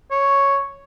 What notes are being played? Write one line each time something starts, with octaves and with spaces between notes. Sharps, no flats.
C#5